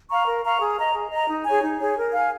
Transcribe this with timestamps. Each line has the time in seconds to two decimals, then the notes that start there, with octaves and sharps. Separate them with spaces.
0.10 F5 A#5 C#6
0.26 A#4
0.44 F5 A#5 C#6
0.61 G#4
0.77 D#5 A#5
0.94 G#4
1.11 D#5 A#5
1.28 D#4
1.44 G#4 C#5 G#5
1.61 D#4
1.79 G#4 C#5 G#5
1.96 A#4
2.13 F5 G#5